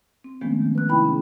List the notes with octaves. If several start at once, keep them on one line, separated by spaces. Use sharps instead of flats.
C4
D#3 F3 G#3 A3 B3 C#4
D#3
B4 F#6
C3 D#4 E4 G5 B5
C#4 D4 G#4